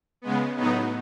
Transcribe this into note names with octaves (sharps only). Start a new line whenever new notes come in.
C#3 G#3 B3
A2 F#3 B3 D#4